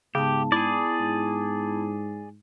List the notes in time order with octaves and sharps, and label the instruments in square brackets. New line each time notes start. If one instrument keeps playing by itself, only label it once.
[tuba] G#2 [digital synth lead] C#3 [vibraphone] B3 A5 [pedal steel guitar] G4
[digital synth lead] E4 [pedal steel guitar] G#4 D5
[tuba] G#2